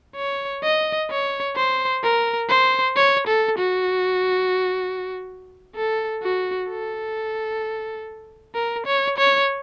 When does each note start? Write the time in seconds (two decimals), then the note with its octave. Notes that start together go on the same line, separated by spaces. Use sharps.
0.16 C#5
0.63 D#5
1.10 C#5
1.56 C5
2.03 A#4
2.49 C5
2.96 C#5
3.27 A4
3.58 F#4
5.75 A4
6.23 F#4
6.69 A4
8.55 A#4
8.86 C#5
9.18 C#5